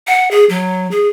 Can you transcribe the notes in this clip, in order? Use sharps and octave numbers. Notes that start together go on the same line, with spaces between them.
F#5
G#4
F#3
G#4